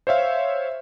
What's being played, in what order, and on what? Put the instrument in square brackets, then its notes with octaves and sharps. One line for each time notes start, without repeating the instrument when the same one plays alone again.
[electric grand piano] C5 C#5 E5 F5